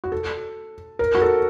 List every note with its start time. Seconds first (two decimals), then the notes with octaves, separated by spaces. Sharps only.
0.04 F#4
0.12 A4
0.99 A#4
1.15 F#4
1.22 A4